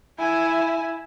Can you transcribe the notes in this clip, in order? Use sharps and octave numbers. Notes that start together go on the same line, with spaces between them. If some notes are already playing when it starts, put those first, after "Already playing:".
E4 G#5